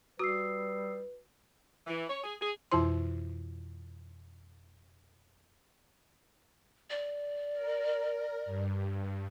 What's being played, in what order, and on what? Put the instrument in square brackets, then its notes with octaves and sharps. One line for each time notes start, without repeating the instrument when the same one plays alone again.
[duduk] G3 [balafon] F#4 [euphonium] B4 [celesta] D#6 E6 C7
[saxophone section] E3
C#5
G#4
G#4
[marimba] F2 B2 E3 E4 C5 C6
[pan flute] D5
[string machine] A#4
G2